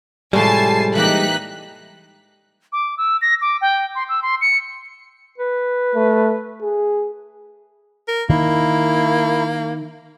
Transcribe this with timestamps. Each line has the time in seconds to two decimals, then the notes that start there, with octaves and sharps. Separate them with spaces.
0.33 A2 C3 F3 G3 G#3 G#5 A5 C7
0.95 E3 A#3 D#4 G4 F#6 B6
2.73 D6
2.98 E6
3.22 A#6
3.41 D6
3.61 G5
3.95 C6
4.09 E6
4.22 C6
4.41 C#7
5.38 B4
5.95 A3
6.62 G#4
8.08 A#4
8.30 D#3 A#3 E4